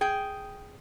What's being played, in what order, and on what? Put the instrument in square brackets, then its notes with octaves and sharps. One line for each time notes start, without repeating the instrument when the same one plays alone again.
[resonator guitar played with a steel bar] G#4 G5